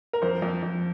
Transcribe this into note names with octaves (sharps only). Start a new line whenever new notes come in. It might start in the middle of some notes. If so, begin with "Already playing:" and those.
A#4
F2 C5
F2
F2